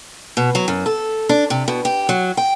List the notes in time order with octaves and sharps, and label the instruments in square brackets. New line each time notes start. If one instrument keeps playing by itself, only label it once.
[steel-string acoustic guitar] B2
F#3
F#2
A4
D4
C3
B2
G4
F#3
G5